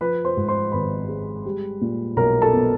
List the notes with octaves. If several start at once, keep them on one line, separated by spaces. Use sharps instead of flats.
F3 B4 B5
C5 C6
G#2
C5 C6
G#1 B4 B5
G#3
G3
A#2
B1 A#4 A#5
A4 A5
B3